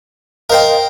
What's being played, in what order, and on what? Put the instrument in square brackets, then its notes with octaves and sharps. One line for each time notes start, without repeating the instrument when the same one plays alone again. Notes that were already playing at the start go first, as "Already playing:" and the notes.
[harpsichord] A#4 C5 G5 [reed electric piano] D#5 F5